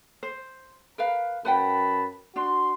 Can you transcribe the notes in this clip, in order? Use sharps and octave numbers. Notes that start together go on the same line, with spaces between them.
C5
A#4 B4 F5
F#2 B4 F#5 G5 A5 B5
D4 F#4 C6